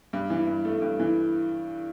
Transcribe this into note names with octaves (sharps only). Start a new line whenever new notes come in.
G2
E3
G2
A3
G2
E3